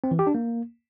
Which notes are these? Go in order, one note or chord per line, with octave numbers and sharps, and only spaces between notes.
C4
E3
G4
D4
A#3